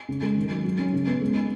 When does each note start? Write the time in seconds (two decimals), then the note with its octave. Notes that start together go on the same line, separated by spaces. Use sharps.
0.09 C#3
0.22 G#3
0.36 D#3
0.50 F#3
0.65 F#3
0.78 C#4
0.93 C#3
1.07 B3
1.21 G#3
1.35 D#4